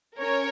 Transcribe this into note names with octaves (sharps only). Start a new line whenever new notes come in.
C#4 A#4 C#5